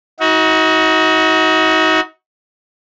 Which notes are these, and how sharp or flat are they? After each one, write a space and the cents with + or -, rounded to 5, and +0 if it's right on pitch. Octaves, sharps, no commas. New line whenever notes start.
D#4 +35 F#4 +0